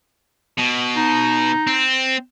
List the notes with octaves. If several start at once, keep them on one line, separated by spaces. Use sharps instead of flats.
B2
D#4
C4